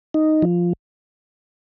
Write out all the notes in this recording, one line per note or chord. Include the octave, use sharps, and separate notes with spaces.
D#4
F3